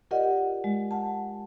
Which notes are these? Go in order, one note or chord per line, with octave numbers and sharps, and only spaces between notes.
F4 G4 A#4 D5 D#5 F#5
G#3
F#5 A5